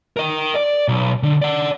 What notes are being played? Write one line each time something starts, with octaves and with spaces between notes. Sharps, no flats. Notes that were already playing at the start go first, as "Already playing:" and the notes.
A#4 D#5
D5
B1
D3
D5 F#5